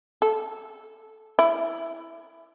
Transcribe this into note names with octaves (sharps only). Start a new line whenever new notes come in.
A4
E4